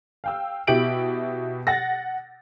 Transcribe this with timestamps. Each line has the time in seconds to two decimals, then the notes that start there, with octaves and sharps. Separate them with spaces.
0.24 F5 G5 E6
0.67 B2 E4 G4 D7 F#7
1.67 F#5 A6 A#6